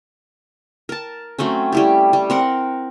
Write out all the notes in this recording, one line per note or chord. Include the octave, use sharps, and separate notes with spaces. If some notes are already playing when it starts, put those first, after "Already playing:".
A#4 A5
F#3 A3 C4 C#4
G3 E4 G4
G3
C4 A#4 F#5